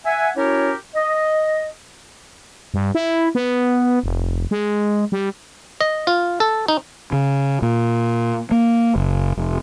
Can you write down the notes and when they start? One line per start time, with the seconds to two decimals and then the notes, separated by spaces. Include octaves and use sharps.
0.06 E5 F#5 G#5
0.37 C#4 E4 F#4 G4 A#4 C#5
0.95 D#5
2.74 G2
2.95 E4
3.35 B3
4.03 F1
4.51 G#3
5.12 G3
5.81 D#5
6.07 F4
6.40 A4
6.68 D#4
7.12 C#3
7.62 A#2
8.51 A#3
8.96 F#1
9.37 F1